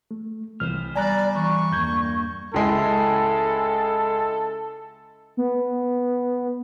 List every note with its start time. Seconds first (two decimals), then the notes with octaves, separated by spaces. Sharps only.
0.11 A3
0.60 C2 E3 B3 F4 C5 F6
0.96 G3 D5 G#5 A#5 F#6
1.35 E3 C#6
1.72 E2 G2 A#3 G6 G#6
2.54 C#2 G#3 E4 A4
5.37 B3